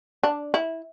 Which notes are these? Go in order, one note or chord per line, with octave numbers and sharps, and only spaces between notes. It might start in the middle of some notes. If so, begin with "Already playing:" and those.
D4
E4